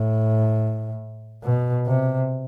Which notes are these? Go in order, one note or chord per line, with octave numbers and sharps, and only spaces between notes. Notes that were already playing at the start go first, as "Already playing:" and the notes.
Already playing: A2
B2
C3